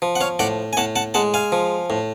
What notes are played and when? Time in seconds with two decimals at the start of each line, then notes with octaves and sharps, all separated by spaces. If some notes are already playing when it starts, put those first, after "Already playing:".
0.02 F3
0.16 F#5
0.21 C#5 F5
0.39 A2 D5 F#5
0.73 G#5
0.77 A2 F#5 A5
0.96 F#5 A5
1.14 G#3 F#5 A5
1.34 F5 G#5
1.52 F3
1.90 A2